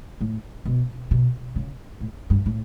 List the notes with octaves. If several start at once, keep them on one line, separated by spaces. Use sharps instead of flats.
A2
B2
B2
C#3
A2
G2
A2